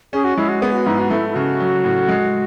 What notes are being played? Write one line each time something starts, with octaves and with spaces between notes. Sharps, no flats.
C#4 G#4
F#4
G#3 E4
F#4
B3 G#4
F#4
G#2 E4
F#4
A3 E4
E4
C#3 F#4
F#3
A2
G#3